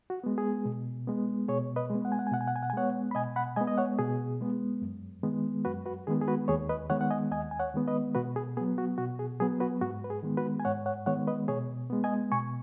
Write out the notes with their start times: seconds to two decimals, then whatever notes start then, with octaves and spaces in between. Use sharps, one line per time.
0.10 F#4
0.24 G#3 B3
0.38 G#4
0.65 B2
1.07 G#3 B3
1.48 B2 G#4 C#5
1.76 B4 D#5
1.90 G#3 B3
2.05 F#5
2.12 G#5
2.19 F#5
2.27 G#5
2.32 B2 F#5
2.41 G#5
2.48 F#5
2.56 G#5
2.63 F#5
2.70 G#5
2.73 G#3 B3 C#5 F#5
3.11 B5
3.15 B2 D#5 G#5
3.36 F#5 B5
3.56 G#3 D#5 G#5
3.61 B3
3.67 D#5
3.78 C#5 F#5
3.99 B2 G#4
4.41 G#3 B3
4.82 F#2
5.23 D#3 G#3 B3
5.65 F#2 F#4 B4
5.86 F#4 B4
6.07 D#3 G#3 B3 G#4
6.22 G#4
6.28 F#4 B4
6.48 D#2 G#4 C#5
6.69 B4 D#5
6.90 D#3 G#3 B3 C#5 F#5
7.01 F#5
7.11 D#5 G#5
7.32 D#2 D#5 G#5
7.51 G#5
7.60 C#5 F#5
7.74 D#3 G#3 B3
7.87 B4 D#5
8.15 B2 F#4 B4
8.36 G#4
8.57 F#3 B3 G#4
8.78 F#4
8.98 B2 F#4
9.19 G#4
9.40 F#3 B3 G#4
9.60 F#4 B4
9.81 G#2 F#4
10.04 B4
10.10 G#4
10.23 D#3 G#3 B3
10.37 F#4 B4
10.60 G#5
10.65 G#2 C#5 F#5
10.86 C#5 F#5
11.06 D#3 G#3 B3 C#5 F#5
11.27 B4 D#5
11.48 B2 G#4 C#5
11.90 G#3 B3
12.04 D#5 G#5
12.32 B2 G#5 C#6